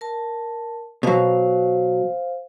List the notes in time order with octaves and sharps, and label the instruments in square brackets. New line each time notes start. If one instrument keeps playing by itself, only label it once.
[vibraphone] A#4 A5
[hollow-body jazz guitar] B2 F#3 [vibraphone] C5 F5